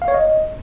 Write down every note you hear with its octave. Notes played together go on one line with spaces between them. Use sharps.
F5
C#5
D#5